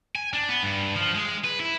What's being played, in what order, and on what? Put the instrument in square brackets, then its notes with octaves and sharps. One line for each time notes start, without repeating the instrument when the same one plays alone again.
[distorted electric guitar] G#5
D4
B3
G2
F3
G#3
B4
E4